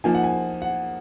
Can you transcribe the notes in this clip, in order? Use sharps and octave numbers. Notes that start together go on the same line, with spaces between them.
F3 A#3 D#4 G#5
F#5
G#5
F#5